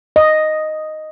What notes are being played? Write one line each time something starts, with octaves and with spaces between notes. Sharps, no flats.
D#5